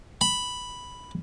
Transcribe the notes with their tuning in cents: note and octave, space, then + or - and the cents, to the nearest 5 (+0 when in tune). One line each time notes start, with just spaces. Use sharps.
B5 +0